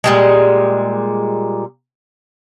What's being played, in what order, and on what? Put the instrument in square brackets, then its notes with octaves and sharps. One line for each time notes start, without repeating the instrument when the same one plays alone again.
[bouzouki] A#2 G3 G#3